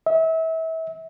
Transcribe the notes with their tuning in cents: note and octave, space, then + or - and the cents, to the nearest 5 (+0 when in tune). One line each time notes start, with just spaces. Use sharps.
E5 -30